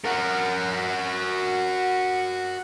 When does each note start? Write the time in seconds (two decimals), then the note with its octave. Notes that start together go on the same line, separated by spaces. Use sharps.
0.05 F#4 A#4